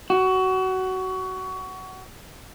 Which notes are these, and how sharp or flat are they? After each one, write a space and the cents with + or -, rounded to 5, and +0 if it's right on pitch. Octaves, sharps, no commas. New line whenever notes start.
F#4 +20